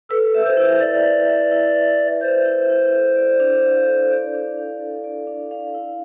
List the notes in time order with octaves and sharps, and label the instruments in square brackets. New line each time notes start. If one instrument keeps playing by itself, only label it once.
[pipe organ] A4 [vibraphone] B4
[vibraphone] E5
[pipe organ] C5
[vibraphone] E4
[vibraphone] E4 [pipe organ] D5
[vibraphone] B4
E5
E4
E4
B4
[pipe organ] C5 [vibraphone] E5
[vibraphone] E4
E4
A4
D5
D4
F5
A4
D5
D4
F5
A4
D5
D4
F5
E4